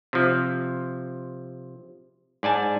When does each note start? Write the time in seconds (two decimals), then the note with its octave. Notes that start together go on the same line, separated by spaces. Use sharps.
0.13 C3 F3
2.43 G#2 D5 G#5 A5